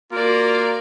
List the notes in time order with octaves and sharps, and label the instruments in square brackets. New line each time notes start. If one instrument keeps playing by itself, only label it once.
[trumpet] A#3 [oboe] F4 [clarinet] F#4 [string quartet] A#4 D5